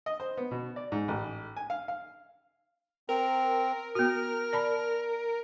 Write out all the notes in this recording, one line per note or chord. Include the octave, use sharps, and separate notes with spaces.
D#5
C5
B3
B2
D5
G#2
A1
G#5
F5
F5
C4 A#4
B3 F#4 F6
D5 A5 B5